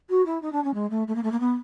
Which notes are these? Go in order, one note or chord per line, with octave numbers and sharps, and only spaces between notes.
F#4
E4
D#4
D4
C#4
G#3
A3
A3
A#3
A3
A#3
B3